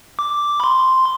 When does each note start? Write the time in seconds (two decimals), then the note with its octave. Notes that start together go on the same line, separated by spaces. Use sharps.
0.19 D6
0.60 B5
0.64 C6